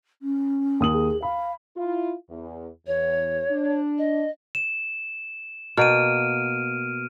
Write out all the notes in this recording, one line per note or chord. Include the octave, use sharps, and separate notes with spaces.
C#4
D#2 D#6 F#7
G#4
F5 B5
E4 F4
E2
E2 C#5
D4
D#5
E7
B2 A#3 F6 D7 D#7